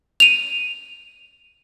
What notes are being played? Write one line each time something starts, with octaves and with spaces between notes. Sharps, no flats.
D#7 F7